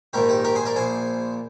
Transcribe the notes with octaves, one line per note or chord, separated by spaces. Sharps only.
A#1 G#2 D#3 G4 A#4
D#4 G4
G4 A#4
G#4 C5
A#4 D5
A#1 A#2 G#4 C5